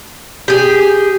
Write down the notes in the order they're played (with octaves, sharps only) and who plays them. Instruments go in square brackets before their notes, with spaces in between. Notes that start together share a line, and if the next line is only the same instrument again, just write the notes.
[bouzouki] G4 G#4